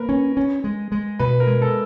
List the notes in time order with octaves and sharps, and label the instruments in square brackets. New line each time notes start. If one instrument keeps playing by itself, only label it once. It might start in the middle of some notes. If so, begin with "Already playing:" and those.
Already playing: [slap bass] A#3 [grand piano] A#4 B4
[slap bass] C#4
C#4
G#3
G#3
[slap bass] B2 [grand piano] B4
[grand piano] A#4
[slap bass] G#3
[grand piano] A4